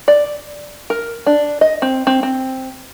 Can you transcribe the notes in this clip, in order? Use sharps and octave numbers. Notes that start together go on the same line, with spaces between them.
D5
A#4
D4
D#5
C4
C4
C4